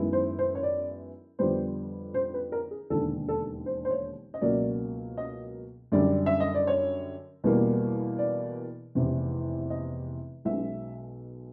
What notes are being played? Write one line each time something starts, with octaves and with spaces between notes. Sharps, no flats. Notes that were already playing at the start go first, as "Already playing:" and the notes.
Already playing: F#2 D#3 G#3 B3 E4
C5
C5
C#5
D5
F2 D3 G3 B3 C5
C5
B4
A#4
G#4
E1 D#2 D3 A4
A4
C5
C5
C#5
D#5
C#2 B2 F#3 A#3 C#4 D5
D#5
F#2 D3 G3 D5
E5
D#5
D5
C#5
E2 B2 G3 A#3
D5
F1 E2 C3 E3
D#5
B1 B2 G#3 C#4 E5